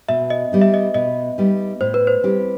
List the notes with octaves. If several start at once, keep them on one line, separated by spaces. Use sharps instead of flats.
B2 E5
D#5
G3 B3 D#4
E5
D#5
B2 D#5
G3 B3 D#4
A2 C5
B4
C5
G3 C4 E4 G4